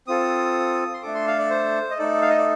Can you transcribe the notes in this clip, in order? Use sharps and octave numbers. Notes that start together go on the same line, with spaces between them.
C4 F4 A4 D#6
C6
A3 D4 A4 D6
C6
F5
D5
C5
D#5
A3 D#4 A4 D5
F5
D#5
D5